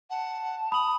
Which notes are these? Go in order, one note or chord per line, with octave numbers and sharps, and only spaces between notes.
F#5 A5
B5 D#6 F#7